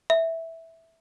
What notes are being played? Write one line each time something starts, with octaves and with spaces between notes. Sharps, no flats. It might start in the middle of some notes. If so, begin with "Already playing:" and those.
E5